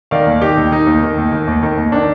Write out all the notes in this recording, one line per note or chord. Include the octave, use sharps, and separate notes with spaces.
D#3 D5 F5
D#2
D#3 D#4 G4
D#2
D#3 D#4
D#2
D#3
D#2
D#3
D#2
D#3
D#2
D#3 D4